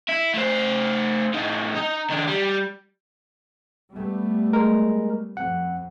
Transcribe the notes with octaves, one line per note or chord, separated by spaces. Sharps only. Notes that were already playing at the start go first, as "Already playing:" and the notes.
E4
A3 C5
A2 D#4
D#4
D#3 D4
G3
G3 A3 B3
G#3 A#4
F2 F#5